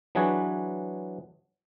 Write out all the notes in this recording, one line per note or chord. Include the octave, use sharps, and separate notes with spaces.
E3 F#3 D4 G#4 B4 C#5